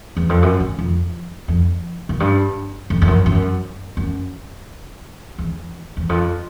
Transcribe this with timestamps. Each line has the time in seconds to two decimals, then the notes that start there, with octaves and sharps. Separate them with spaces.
0.17 E2
0.29 F2
0.42 F#2
0.60 F#2
0.78 F2
1.48 F2
2.09 F#2
2.20 G2
2.90 F2
3.02 F2
3.07 F#2
3.26 F#2
3.97 F#2
5.38 E2
5.97 E2
6.09 F2